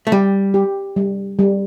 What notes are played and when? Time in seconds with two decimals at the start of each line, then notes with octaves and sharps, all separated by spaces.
0.07 A3
0.12 G3 G4
0.54 G4
0.96 G3
1.39 G3